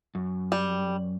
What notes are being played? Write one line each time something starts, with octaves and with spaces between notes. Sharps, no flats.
F#2
G3